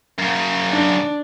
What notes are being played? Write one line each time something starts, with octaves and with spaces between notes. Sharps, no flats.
F#2 C#3
D4